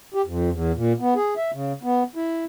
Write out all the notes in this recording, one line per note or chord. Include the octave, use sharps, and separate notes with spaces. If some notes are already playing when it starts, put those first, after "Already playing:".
G4
F2
E2
A#2
B3
G#4
E5
C#3
B3
E4